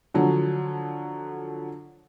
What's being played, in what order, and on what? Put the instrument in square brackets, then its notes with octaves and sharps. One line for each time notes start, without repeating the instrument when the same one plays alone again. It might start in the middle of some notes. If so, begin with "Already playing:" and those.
[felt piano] D3 F3 F#3